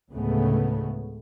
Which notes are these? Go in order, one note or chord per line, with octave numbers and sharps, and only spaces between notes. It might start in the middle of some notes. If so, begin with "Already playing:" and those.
D2 A2 C#3 G#3 A3 B3